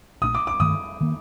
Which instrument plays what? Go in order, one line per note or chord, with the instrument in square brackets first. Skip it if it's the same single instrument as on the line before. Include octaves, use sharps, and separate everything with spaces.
[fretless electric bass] A#1 A#2 A3 D4 [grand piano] D#6
[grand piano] D6
D6
[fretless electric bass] G2 D#3 A3 [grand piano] D#6
[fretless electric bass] D#3 A#3